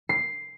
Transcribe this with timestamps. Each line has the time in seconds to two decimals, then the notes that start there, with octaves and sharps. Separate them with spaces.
0.09 C7